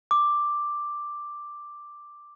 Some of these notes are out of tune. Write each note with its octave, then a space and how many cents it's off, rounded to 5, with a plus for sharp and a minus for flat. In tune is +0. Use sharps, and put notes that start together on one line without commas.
D6 +5